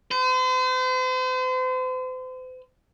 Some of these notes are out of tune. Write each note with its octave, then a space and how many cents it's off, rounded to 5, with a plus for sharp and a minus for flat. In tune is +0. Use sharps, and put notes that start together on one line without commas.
C5 -40